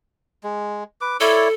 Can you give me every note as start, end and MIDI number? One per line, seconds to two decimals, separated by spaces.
0.44 0.84 56
1.01 1.17 71
1.01 1.17 86
1.20 1.48 64
1.20 1.54 69
1.20 1.48 73
1.20 1.48 74